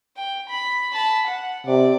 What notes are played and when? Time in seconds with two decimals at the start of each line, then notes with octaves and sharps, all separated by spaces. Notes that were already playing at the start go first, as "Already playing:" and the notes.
0.17 G5
0.49 B5
0.94 A5 B5
1.27 F#5
1.67 C3 D5